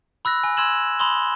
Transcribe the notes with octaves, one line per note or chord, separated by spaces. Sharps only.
B5 E6 F#6 A#6
G#5
C6 E6 G#6 E7 F#7
B5 C6 D#6 G7